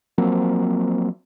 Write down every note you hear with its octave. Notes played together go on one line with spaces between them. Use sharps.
F3 F#3 A#3 C4